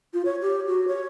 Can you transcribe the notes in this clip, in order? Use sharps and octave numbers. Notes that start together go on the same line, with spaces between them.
F4
C#5
G4
F#4
C#5